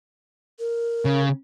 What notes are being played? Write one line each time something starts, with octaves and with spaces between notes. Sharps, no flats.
A#4
C#3